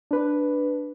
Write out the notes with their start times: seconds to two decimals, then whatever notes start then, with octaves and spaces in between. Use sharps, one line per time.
0.11 D4 B4